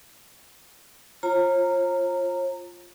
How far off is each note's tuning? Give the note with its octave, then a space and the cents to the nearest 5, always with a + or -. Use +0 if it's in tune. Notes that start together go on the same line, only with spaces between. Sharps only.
F4 +0 C#5 -45 A#5 -20